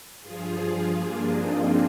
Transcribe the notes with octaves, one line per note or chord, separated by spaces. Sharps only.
G2 F3 F4 G#4
F4 G#4
A#3 D4
C4 D#4